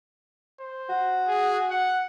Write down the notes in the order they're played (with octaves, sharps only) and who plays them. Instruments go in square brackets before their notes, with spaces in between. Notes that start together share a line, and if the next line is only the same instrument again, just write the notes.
[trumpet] C5
[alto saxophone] F#4
[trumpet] G#4
F#5